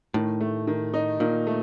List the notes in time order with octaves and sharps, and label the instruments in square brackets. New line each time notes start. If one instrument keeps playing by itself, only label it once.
[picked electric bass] A2 [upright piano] D#3
[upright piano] A3
D#3
D#4
[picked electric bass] A#2 [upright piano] D#3
[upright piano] A3